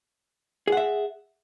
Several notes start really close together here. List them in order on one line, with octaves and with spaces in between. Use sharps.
G#4 F#5 E5